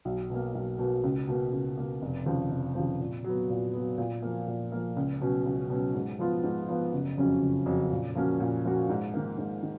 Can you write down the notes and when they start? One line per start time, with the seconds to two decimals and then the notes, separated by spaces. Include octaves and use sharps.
0.05 B1
0.30 B2 A#3
0.55 B1
0.79 B2 A#3
1.03 C#2
1.28 B2 A#3
1.52 C#2
1.78 B2 A#3
2.02 F1
2.26 D#2 C#3 F3
2.51 F1
2.75 D#2 C#3 F3
3.00 A#2
3.24 F#3 B3
3.49 A#2
3.74 F#3 B3
3.98 A#2
4.23 F3 A#3
4.48 A#2
4.72 F3 A#3
4.96 C#2
5.21 B2 F#3 C#4
5.46 C#2
5.70 B2 F#3 C#4
5.95 G#2
6.19 F3 B3 F4
6.43 G#2
6.68 F3 B3 F4
6.93 F#1
7.18 F2 C#3 F#3 C#4
7.42 F#1
7.66 F2 C#3 F#3 C#4
7.91 A#2
8.15 F3 A#3 C#4 F#4
8.40 A#2
8.65 F3 A#3 C#4 F#4
8.89 G#2
9.14 D#3 A#3
9.38 G#2
9.63 D#3